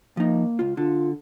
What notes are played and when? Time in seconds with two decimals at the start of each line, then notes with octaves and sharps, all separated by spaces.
0.17 F3 A#3 D#4
0.59 C#2 F4
0.77 D3 F4 A4